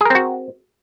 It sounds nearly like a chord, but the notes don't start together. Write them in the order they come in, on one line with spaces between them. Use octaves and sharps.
G#4 A#4 C4 F#4